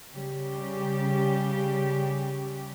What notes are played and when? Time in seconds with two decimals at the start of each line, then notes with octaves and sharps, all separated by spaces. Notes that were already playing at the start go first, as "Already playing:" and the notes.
0.13 C#3 G3 G4